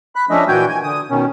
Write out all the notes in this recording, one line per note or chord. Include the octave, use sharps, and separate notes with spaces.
B5 F#6
F3 A3 C#4 D4 D#5 E5
A#2 E3 F#4 G5 G#5 G6
G#5
D3 D#6
B2 D#3 C#4